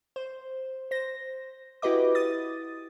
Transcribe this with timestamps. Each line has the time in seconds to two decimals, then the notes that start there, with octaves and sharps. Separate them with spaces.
0.16 C5
0.91 C5 A#6
1.82 E4 F#4 G4 B4 D#5 D6
2.15 D#6 A6